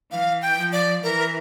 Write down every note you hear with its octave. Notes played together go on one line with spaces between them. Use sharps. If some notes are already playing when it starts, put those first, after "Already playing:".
E3 F5
G5
F3
D5
E3 A#4